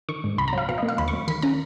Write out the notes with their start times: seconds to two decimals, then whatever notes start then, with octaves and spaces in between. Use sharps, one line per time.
0.09 D#3 C#6
0.24 G#2
0.38 C#2 B5
0.48 A#5
0.53 F#3 F5
0.69 B2 F5
0.78 D#5
0.83 A#3
0.88 F5
0.98 D#2 B5
1.08 C#6
1.13 F#3
1.28 D#3 B5
1.42 C#4 A#5